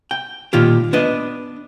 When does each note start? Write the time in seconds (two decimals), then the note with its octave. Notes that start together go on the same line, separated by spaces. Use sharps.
0.11 G5
0.53 A#2 D#3 F4 G4
0.93 B3 D4 B4 D#5